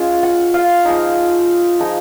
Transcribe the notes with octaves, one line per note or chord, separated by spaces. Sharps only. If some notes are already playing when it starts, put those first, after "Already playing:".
Already playing: G#3 C#4 F4
F#5
F5
F3 G#3 D#4
F3 G#3 D#4